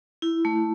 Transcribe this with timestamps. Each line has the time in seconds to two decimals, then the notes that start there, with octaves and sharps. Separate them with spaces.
0.22 E4
0.45 A3